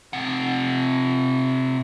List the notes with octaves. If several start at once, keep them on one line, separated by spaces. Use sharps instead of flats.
C3 F#5